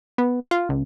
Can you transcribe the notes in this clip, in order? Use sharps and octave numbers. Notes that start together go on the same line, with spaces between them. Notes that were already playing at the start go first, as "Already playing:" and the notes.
B3
F4
C#2